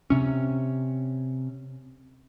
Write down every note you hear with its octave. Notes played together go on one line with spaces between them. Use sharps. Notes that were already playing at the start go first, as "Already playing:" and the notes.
C3 C#4